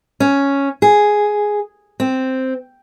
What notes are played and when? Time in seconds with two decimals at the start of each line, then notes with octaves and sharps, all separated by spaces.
0.20 C#4
0.82 G#4
2.00 C4